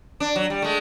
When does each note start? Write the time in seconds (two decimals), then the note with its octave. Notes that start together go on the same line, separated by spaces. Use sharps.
0.20 D4
0.36 F#3
0.50 G3
0.62 G#3 A3